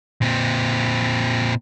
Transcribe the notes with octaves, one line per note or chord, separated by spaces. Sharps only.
A#2 C4